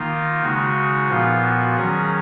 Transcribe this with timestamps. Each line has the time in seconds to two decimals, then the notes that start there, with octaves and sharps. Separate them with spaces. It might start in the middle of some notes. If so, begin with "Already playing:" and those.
Already playing: D#3 A#3 D#4 F4
0.42 C#3 G#3 D#4 F#4
1.08 A#2 F3 B3 F4
1.42 F#4
1.76 D#3 F#3 C#4 G#4